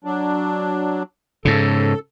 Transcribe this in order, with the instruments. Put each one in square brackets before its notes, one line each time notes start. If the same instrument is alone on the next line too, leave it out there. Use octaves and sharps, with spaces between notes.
[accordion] F#3 D4
[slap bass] G#2 C#3 [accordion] A4